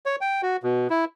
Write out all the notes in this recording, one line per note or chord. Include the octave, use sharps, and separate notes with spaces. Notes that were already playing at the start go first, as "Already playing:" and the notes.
C#5
G5
F#4
B2
E4